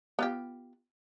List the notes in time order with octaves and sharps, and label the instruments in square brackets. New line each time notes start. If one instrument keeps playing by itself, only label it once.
[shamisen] B3 F4 G4